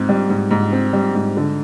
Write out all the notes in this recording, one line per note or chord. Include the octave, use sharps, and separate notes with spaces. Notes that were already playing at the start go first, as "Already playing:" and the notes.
Already playing: G#2 C4
G3
G#2
G#2
C4
G3
G#2
D3